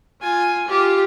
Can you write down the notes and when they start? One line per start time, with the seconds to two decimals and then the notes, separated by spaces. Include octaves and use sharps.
0.21 F4 G#5
0.68 F4 G4